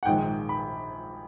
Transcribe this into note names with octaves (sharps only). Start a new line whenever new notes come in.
F#5
A#1 G#2 D#3 G#3 G5
B5